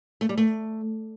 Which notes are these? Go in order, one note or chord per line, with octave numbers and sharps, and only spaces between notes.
A3
G3
A3